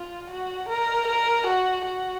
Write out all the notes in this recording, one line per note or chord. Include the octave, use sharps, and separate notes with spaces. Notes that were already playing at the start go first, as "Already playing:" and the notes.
Already playing: F4
F#4
A#4
A#4
F#4
F#4